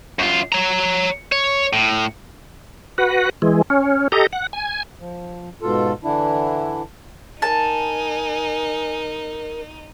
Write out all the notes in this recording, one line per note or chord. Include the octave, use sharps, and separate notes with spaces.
F#2 F4
C#5 A#5
C#5
A2
F#4 B4 F#5
E3 G#3
C#4
G4 A4 D#5 A#5
F#5
G#5
F3
G#2 B2 F4 A4
D3 E3 D4 E4
D#4 A#4 G#5 A5